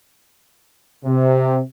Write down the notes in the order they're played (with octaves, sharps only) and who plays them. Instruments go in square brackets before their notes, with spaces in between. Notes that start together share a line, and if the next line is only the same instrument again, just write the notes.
[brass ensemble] C3